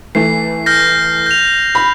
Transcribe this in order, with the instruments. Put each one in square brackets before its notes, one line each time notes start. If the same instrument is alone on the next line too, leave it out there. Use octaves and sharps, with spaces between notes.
[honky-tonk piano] E3 A3 [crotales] C7
[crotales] F6 G6 A#6
G6 F7
[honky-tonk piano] B5